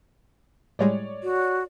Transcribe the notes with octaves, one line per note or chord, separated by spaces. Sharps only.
A2 G3 G#3 C#5 D5
F#4